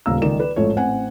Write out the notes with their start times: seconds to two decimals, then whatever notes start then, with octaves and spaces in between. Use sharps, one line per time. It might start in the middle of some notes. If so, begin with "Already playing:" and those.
0.06 D#1 A#2 C#3 F5 A#5 E6
0.22 C#2 D#3 D#4 D5 E7
0.39 B4 D5
0.56 A1 G#2 F3 A3 C#5
0.76 A1 C4 F#5 G#5